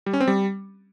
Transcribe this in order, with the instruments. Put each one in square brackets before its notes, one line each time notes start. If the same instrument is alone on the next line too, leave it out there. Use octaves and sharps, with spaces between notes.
[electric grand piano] G3
C#4
C4
G3